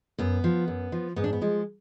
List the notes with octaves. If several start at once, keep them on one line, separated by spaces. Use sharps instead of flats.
F#2 B3
F3
F#2
F3
G#2 B3
D4
B3
F3 G#3